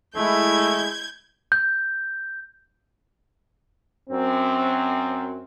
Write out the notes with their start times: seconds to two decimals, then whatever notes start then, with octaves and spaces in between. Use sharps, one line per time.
0.16 G#3 A3 E4 G6 G#6
1.52 G6
4.09 F#2 C4